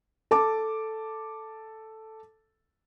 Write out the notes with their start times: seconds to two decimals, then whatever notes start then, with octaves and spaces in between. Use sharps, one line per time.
0.31 A4 A5 D6